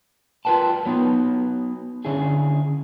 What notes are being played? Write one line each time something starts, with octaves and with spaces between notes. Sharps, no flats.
F4 A#4 B4 G5 A5
F#3 B3 D#4
D3 C#4 E4 G#4